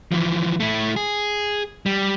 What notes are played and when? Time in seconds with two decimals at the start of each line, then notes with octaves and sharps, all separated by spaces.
0.12 E3 F3
0.60 A3 E4
0.96 G#4
1.86 G3